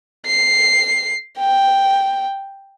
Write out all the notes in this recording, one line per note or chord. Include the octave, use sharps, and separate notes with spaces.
C7
G5